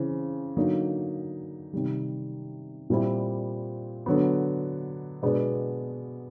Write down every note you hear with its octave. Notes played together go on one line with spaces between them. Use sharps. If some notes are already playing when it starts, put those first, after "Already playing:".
Already playing: C#3 E3 C4
D3 F#3 A#3 D#4
C3 D#3 G3
A#2 G3 C4 E4
D3 F#3 B3
B2 G#3 B3 D4